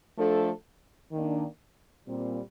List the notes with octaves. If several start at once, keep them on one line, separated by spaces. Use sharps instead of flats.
F3 A3 D4 A4
D#3 A#3 D4
A#2 G3 C4